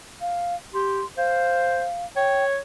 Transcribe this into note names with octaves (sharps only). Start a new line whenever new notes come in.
F5
G4 C6
C5 F5
C#5 G5